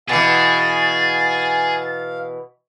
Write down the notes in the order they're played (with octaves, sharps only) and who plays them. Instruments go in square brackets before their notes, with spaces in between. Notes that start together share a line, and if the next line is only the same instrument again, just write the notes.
[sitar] B2 E3 [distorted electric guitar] G#4 [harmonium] F5 [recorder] A6